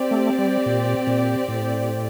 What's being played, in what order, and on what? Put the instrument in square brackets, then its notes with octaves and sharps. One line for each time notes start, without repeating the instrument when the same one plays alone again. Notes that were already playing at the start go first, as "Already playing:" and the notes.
Already playing: [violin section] C4 G4 D5
[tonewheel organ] A3
G3
A#2
A#2
A2